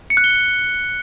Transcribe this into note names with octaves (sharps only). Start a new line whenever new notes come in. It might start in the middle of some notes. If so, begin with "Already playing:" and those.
C#7
F#6
G7